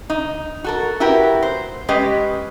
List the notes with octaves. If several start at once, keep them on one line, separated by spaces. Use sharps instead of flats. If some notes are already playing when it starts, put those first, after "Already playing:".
D#4
F#4 A4 A#4
E4 F#4 G4 A#4 B4
C5
G#3 C#4 G4 B4 D#5